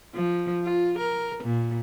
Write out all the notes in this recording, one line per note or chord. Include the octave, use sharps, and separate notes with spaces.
F3
F4
A#4
A#2